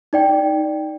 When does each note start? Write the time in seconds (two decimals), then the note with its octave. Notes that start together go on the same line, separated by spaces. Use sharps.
0.13 D#4 D5 G5